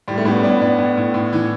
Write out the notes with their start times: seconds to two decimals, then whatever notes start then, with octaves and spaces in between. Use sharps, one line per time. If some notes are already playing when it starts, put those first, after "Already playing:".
0.08 A2 G3
0.18 A3
0.25 A2 G3 B3
0.36 C#4
0.43 A2 B3 D4
0.61 A2 B3 D4
0.79 A2
0.97 A2
1.14 A2
1.33 E3